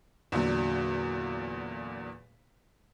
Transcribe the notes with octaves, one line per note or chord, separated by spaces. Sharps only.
E2 A#2 D3 F#3